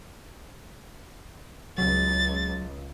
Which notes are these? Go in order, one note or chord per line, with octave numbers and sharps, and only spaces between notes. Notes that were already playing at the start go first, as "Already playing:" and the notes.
C#2 F#3 A6